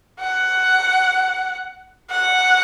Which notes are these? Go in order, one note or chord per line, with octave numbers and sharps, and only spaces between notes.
F#5
F#5